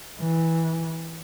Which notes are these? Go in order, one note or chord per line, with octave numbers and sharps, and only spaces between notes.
E3